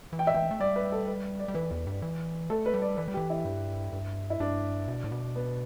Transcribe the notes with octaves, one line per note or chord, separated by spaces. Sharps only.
E3
G5
E5
E3 G5
A3
G3 D5
B4
A4
B4
D5
G3
E3 B4
E2
G2
E3
A3 A4
B4
G3
D5
E3 B4
G3
E3 G4
E4
G2
G2
E4
G2 D4
B2
A2
B2
B3